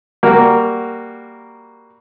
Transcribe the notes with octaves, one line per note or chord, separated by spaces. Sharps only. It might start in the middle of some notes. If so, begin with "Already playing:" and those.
G3 A#3 F#4 A#4